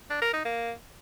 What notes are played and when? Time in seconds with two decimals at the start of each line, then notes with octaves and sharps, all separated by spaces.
0.10 D4
0.22 A#4
0.34 D#4
0.45 A#3